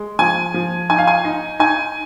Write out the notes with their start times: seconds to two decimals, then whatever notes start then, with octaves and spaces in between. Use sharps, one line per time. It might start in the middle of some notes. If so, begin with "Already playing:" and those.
Already playing: G#3
0.19 F3 G#5
0.54 F3
0.90 D#4 G#5
0.98 F5
1.07 G#5
1.25 D#4
1.60 D#4 G#5